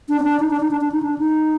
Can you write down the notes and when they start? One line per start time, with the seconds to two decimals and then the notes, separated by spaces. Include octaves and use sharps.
0.09 D4
0.20 C4
0.23 D4
0.40 D#4
0.50 D4
0.60 D#4
0.71 D4
0.81 D4
0.92 D#4
1.03 D4
1.18 D#4